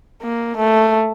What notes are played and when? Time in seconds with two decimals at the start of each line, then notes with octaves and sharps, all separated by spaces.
0.23 A#3
0.58 A3